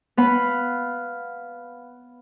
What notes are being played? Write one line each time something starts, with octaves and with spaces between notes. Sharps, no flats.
B3 F5 B5